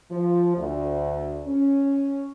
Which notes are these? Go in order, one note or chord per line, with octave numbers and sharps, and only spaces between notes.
F3
D2
C#4